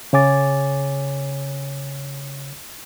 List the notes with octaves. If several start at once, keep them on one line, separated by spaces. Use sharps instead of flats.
C#3 C#5 G#5 D6 A6